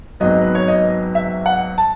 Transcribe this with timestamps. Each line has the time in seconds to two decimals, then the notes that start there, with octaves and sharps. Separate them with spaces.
0.20 G#1 G#2 F#3 B3 D#5
0.42 B4
0.55 C#5
0.68 D#5
1.15 E5
1.46 F#5
1.78 A5